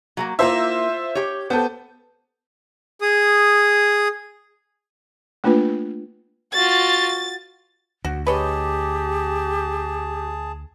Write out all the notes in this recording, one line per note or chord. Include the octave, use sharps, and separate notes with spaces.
F#3 A3 A#3
A#3 E4 F4 C5 E5
G4 C#5
B3 A4 C5 G5
G#4 D#6
A3 A#3 D4 F4 B4
F4 F#4 A6
D2 F#4
G4 G#4 B4 C#5 D#5 A5